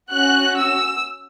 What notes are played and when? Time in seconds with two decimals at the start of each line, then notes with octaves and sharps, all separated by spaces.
0.10 C#4 F#4 F#6
0.57 E6